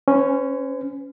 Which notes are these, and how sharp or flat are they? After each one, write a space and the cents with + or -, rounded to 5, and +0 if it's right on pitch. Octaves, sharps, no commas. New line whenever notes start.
C#4 +0 C5 -45